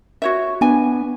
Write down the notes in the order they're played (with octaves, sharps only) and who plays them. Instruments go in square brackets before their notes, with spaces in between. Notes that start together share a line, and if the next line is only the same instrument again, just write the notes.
[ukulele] F#4 C#5 E5
[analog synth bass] B3 [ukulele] D4 G#5